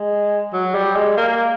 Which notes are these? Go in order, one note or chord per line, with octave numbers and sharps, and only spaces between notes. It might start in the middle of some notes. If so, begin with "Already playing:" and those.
Already playing: G#3
F#3
G3
G#3
A#3